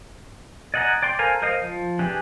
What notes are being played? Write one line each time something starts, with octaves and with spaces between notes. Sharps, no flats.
D5 D#5 F#5 G#5 A#5
D5 G5 C6
A4 A#4 C5 F5 G#5
A#4 C5 D#5 F5
F3
E3 D4 G4 G#4